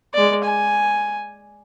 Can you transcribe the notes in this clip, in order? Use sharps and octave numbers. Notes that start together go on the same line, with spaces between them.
G#3 D5
G#5